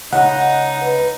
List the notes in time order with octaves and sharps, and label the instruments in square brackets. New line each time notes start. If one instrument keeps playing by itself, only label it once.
[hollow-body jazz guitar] C#2 [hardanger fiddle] D#4 [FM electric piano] F#5
[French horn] B4